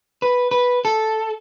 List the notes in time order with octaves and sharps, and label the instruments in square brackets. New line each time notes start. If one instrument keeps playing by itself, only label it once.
[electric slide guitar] B4
B4
A4